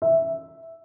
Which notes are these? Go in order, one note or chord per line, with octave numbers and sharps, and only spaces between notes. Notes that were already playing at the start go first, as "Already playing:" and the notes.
E5